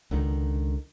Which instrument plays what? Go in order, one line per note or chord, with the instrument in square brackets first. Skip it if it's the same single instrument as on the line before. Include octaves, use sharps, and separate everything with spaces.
[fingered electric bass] C#2 D3 D#3